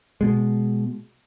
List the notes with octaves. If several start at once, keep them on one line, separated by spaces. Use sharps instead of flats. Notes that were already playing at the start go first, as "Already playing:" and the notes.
B2 G#3